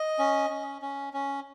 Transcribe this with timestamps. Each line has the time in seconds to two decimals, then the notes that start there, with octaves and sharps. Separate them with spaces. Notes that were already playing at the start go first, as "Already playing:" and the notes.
Already playing: D#5
0.19 C#4
0.50 C#4
0.82 C#4
1.13 C#4